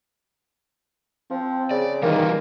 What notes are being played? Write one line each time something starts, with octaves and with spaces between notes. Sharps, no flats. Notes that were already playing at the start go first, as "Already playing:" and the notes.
F3 C4
C#3 D5
D#3 E3 G3 A#3 B4